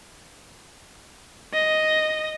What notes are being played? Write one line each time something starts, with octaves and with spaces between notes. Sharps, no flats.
D#5